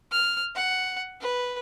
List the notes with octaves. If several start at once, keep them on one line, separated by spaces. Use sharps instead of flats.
F6
F#5
B4